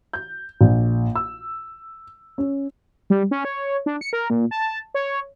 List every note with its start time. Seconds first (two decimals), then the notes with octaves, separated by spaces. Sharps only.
0.13 G6
0.61 A#1
1.15 E6
2.38 C#4
3.10 G3
3.31 C#4
3.45 C#5
3.86 D4
4.01 C#7
4.13 A#4
4.30 A#2
4.51 A5
4.95 C#5